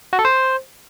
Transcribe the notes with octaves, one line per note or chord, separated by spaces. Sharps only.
F#4
A4
C5